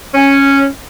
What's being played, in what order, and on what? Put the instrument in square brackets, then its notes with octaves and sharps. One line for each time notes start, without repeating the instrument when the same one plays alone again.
[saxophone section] C#4